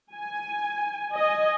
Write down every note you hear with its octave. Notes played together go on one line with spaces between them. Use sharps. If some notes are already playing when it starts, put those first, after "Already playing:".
G#5
D#5 G#5